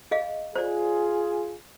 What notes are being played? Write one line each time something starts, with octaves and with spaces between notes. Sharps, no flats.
G#4 D#5 F5
F4 G#4 C5 D5